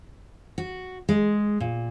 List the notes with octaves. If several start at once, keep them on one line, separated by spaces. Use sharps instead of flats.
F#4
G#3
A#2